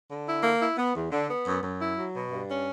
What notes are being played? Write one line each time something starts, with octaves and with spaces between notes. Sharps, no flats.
D3
E4
A#3
E4
B3
E2
D3
B3
F#2
F#2
E4
F#3
B2
G2
C#4